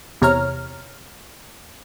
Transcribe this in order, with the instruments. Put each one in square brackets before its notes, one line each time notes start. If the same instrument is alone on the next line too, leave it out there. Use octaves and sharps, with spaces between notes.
[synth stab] E2 C3 C#5 A#5 F6